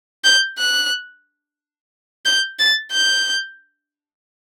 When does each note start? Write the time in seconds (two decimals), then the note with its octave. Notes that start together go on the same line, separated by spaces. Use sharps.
0.24 G6
0.58 F#6
2.26 G6
2.59 A6
2.92 G6